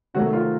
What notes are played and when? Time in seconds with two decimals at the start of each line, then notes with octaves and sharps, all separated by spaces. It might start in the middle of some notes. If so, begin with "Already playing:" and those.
0.14 C3 D#3 F#3 A3 F#4
0.33 F4